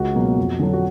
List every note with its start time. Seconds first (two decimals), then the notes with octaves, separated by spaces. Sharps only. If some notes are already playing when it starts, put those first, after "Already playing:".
Already playing: C#2 F#4
0.15 B2 F#3 A#3
0.38 F2
0.59 D3 F#3
0.73 F#4